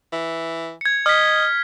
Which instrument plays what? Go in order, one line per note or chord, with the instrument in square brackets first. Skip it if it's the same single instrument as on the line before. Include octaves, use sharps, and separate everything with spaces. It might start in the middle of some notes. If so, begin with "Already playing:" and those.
[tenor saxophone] E3
[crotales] G#6 C#7
[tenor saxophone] D#5 [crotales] F6 B6